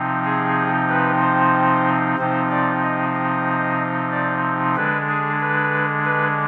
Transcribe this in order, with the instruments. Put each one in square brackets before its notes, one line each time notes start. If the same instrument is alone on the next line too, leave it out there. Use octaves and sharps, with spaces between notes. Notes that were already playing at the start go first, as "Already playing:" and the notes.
Already playing: [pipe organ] C3 F3 C4 D#4
G#4
B4
C5
C3 F3 C4 D#4 C5
D5
D#5
D#5
D5
D3 G#3 D4 B4
G#4
B4
B4